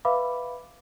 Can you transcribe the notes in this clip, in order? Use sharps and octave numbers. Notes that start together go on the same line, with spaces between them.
B4 E5 F5 B5 D6